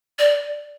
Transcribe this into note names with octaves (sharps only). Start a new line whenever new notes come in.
D5